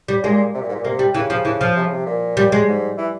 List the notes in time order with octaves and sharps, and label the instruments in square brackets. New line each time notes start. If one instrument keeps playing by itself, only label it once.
[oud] G3
[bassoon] A#2 [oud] G#3
[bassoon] C3
A#2
G#2
A#2
[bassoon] C3 [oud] A#3
[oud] G3
[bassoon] C#3 [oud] E3
[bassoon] C#3 [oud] F3
[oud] E3
F3
[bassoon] C3
C#3
C3
A#2
[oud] G3
G#3
[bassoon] G#2
E3